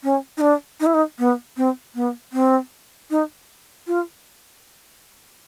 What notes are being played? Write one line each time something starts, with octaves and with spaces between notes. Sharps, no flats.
C#4
D#4
D4
D#4
E4
D#4
B3
C4
B3
C4
D#4
F4